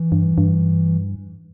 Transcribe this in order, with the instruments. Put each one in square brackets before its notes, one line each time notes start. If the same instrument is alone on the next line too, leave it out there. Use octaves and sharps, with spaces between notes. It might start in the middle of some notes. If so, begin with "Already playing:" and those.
Already playing: [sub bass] E3
[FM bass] G2
G2